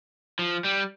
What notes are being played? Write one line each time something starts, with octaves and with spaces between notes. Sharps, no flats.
F3
G3